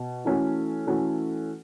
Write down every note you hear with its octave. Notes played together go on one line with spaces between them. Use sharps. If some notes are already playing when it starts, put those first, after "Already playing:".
Already playing: B2
E3 A3 C#4 F#4 A4
E3 A3 C#4 F#4 A4